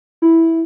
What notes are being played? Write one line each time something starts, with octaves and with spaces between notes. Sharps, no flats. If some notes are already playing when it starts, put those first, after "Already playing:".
E4